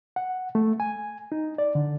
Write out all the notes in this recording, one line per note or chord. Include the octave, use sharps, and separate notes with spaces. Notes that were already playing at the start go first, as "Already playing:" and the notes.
F#5
A3
G#5
D#4
D5
D3